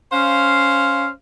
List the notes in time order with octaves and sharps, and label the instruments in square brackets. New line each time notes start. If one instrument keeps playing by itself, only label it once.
[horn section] C#4 C5 F5